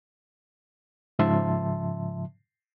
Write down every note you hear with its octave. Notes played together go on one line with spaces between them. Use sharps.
G#2 C#3 F3 E5 A5 C6